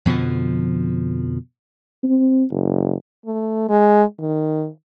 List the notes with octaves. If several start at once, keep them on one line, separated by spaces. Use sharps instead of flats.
F2 B2 D3 F3
C4
F#1
A3
G#3
D#3